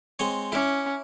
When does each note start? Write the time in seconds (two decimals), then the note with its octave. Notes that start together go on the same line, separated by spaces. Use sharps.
0.19 G#3 C4 C#5
0.52 C#4 E4 D6